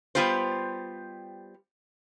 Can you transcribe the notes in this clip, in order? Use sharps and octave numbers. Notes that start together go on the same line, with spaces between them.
G3 B3 F4 G4 C5